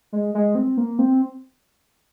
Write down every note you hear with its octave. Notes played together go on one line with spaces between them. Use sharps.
G#3
G#3
C4
A#3
C4